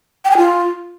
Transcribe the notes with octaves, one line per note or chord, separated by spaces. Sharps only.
G5
G#5
F4